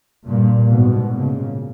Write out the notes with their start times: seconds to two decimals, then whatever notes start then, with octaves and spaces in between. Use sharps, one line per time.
0.25 G2 A#2
0.68 G#2 B2
1.11 A#2 C#3